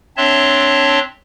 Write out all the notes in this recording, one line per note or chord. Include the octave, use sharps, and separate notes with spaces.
C4 D4 C#5 E5 A5 C6